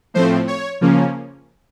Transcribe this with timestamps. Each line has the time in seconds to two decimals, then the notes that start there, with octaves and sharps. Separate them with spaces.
0.14 A2 F3 A3 C4 C5
0.48 C#5
0.81 C#3 F3 A#3 C#4